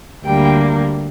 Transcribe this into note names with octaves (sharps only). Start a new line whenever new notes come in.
D2 D3 G3 A#3 G5